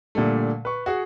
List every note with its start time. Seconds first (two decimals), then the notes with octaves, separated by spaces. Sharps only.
0.15 A#2 D3 G3 A3
0.65 B4 C#6
0.86 F#4 G#4 F#5